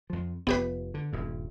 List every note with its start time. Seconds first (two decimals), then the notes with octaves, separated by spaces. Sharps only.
0.10 F2 F3
0.47 F1 B3 G4 B4
0.94 D3
1.13 D#1 G2